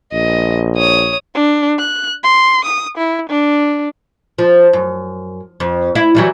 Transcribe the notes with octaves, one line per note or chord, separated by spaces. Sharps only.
A#1 D#5
C#5 D#6
D4
F#6
C6
D#6
E4
D4
F3
F#2
F2
E4
E3 F#3 G3